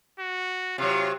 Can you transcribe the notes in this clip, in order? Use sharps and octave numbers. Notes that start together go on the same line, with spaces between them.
F#4
C3 F#3 F4